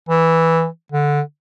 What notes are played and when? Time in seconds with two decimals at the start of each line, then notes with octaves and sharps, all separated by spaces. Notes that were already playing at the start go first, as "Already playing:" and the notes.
0.09 E3
0.92 D3